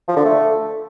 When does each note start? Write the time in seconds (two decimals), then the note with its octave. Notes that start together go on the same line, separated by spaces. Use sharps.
0.08 F3
0.17 D3
0.25 A3